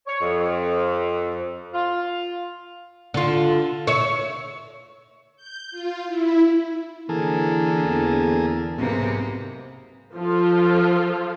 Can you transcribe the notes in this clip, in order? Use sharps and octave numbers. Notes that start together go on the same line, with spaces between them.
C#5
F2
F4
D3 F4
C#5 E5
G6
F4
E4
D3 E3 A#3 G#4 A4
E2
B1 G#2 C3 A#3 B4
F3 F4 A4